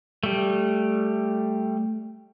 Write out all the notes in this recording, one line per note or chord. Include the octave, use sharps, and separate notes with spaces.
G3 A3